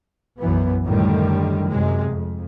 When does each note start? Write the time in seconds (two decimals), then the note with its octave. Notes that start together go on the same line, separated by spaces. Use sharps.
0.39 B1 F#2 E3 B3
0.84 F#2 A2 D3 D#3 G3
1.68 F#2 C3 G#3
2.07 F2